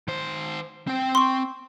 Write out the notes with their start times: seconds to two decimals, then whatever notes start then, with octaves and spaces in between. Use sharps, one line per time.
0.08 D#3 C5
0.87 C4 G5
1.15 C6 C#6